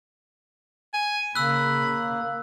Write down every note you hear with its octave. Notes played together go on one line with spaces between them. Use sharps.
G#5
C#3 A#3 B5 E6 F#6